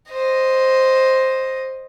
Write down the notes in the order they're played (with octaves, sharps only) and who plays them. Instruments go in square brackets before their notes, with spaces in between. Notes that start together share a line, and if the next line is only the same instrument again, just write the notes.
[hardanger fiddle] C5 D#5